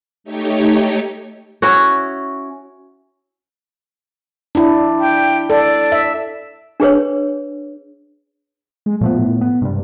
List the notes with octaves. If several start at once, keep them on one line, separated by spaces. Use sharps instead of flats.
A3 D#4 G4 C#5
C#4 E4 F#4
D4 E4
G5
A4 D5
E5
D4 G#4 B4 C#5
G#3
A#2 F3 A3 B3
A2
B3
G2 C3 G3